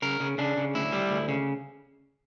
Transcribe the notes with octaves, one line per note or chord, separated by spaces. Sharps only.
C#3 A#4
C#3
C#3 D4
C#3
D2 E4
G3
D2
C#3